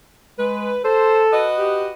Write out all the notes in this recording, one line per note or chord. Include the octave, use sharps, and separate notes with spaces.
G#3 B4
A4 C5
F#4 B4 D#5
G4